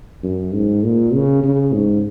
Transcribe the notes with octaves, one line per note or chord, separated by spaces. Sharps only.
F#2
G#2
A#2
C#3
C#3
G#2